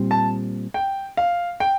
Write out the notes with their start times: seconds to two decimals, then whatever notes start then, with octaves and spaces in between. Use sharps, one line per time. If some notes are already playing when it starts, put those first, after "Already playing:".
Already playing: A#2 G3 C4
0.11 A5
0.74 G5
1.17 F5
1.60 G5